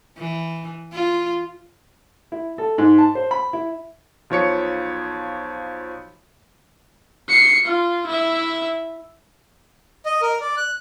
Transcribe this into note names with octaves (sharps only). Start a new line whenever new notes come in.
E3
F4
E4
A4
G#2
A5
C5
B5
E4
B1 F3 C#5 C#7
C7 C#7
F4
E4 E5
D#5
A#4
D5
F#6